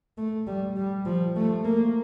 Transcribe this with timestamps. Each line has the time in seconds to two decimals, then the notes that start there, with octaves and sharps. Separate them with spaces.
0.18 A3
0.47 G3
0.76 G3
1.06 F3
1.36 A3
1.65 A#3